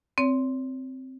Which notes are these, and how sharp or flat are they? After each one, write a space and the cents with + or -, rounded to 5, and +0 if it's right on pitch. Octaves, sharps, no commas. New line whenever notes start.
C4 +0 C#5 +35